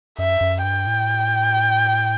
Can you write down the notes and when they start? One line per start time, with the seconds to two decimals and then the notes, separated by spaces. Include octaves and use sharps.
0.18 F#2 E5
0.41 F#2
0.64 G2 G5
0.87 A2